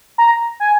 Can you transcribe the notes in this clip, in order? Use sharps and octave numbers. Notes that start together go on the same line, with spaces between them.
A#5
G#5